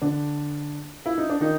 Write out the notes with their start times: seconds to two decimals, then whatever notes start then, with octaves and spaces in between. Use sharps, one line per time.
0.02 D3 D4
1.06 E4
1.18 D#4
1.30 D4
1.40 D#3 D#4